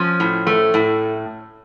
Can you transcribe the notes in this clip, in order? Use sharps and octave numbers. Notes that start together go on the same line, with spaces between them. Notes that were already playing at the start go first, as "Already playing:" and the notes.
Already playing: F3 C#4
A2
A3
A2